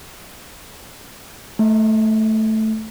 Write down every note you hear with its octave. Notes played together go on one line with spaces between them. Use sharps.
A3